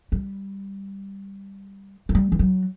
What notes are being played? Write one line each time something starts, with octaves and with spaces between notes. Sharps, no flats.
G3
F#3
G3
E3
F#3